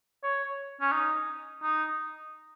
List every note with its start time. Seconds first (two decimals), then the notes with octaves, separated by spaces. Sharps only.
0.23 C#5
0.81 C#4
0.92 D#4
1.62 D#4